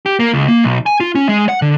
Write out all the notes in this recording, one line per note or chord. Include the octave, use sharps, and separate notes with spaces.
G4
A#3
C#2
A#3
B1
G#5
F4
C#4
G#3
F#5
D3